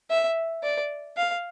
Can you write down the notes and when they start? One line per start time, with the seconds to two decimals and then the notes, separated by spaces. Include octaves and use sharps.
0.10 E5
0.63 D5
1.17 F5